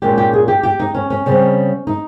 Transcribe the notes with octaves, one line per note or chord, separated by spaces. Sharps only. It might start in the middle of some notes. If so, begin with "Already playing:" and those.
A#2 G#3 C#4 G4
G4
G#4
G4
G4
D#4
C#4
C#4
C#3 G3 C4
D#4